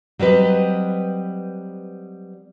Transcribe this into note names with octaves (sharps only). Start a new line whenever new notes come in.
F#3 G3 C4 B4 D#5